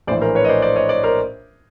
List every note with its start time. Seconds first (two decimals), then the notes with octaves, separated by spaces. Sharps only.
0.07 A#1 A2 E3 C5 D5
0.22 A#4 C5
0.35 B4 C#5
0.45 D#5
0.49 C5 D5
0.62 C5 D5
0.76 C#5 D#5
0.89 C5 D5
1.03 A#4 C5